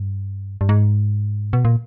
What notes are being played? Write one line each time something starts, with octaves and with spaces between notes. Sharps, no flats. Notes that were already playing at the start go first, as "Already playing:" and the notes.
Already playing: G2
G2
G#2
B2
A#2